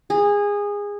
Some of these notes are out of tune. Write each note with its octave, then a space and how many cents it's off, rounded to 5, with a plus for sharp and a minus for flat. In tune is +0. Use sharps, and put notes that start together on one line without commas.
G#4 -20